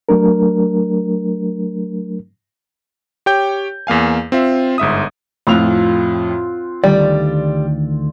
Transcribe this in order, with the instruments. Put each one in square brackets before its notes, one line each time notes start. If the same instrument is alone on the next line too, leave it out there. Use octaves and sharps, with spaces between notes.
[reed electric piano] F#3 A3 D4 A#4
[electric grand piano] G4 C#5 G5 G6
E2 A#3 F5 G#5
C4 F4 E5
G1 G#2 E5 D#6
[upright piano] F2 A2 F7 [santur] C4 F4 F#5
[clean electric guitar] D2 D#3 D5 [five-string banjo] G3 [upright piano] G5